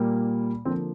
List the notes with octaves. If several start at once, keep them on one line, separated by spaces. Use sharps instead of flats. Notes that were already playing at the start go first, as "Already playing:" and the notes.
Already playing: A#2 G3 A#3
D3 F3 A#3 C4